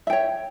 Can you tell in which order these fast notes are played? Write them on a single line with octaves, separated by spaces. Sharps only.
E5 G5 C#5